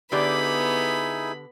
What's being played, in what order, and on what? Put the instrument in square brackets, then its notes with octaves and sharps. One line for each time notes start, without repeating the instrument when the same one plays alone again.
[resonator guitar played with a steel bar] D3 G4 D5 [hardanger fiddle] B3 B5 [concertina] D#4 E4 G#4